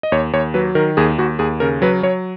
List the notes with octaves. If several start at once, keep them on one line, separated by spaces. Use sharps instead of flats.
D#5
D#2 C#5
D#2 C#5
F#3 B4
D#3 A#4
D#2 G#4
D#2 F#4
D#2 G#4
C#3 A#4
F#3 B4
F#3 C#5